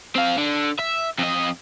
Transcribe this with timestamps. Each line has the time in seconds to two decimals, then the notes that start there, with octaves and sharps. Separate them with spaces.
0.15 C4 F5
0.37 D3
0.79 E5
1.18 F2 D#5